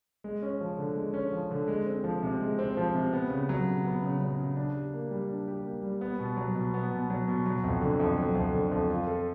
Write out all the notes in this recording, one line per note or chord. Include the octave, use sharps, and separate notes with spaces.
G#3
C#4
F3
D3
G#3
C#4
F3
D3
G#3
C4
F3
C3
G#3
C4
F3
C3
B3
C#3
F#3
C#3
B3
C#3
F#3
C#3
D4
G4
A#3
G3
D4
G4
A#3
G3
B3
B2
F#3
B2
B3
B2
F#3
B2
F#3
F2
D3
F2
F#3
F2
D3
F2
F4
A4